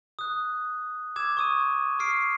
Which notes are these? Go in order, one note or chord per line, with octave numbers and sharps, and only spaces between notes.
D#6 F#6
D6 E6 G#6 E7
C#6 D#6 D#7
C#6 D#6 F6 C7 D7